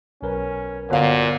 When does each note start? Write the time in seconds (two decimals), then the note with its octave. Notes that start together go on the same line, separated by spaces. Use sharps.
0.22 B1 C#4 A#4 B4
0.90 G1 A#2 F#4 F5